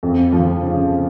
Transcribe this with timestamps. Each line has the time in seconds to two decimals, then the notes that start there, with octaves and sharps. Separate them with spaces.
0.03 F2
0.32 F3
0.62 C#3